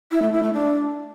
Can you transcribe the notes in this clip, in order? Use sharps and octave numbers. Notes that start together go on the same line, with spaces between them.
E4
A3
E4
A3
D4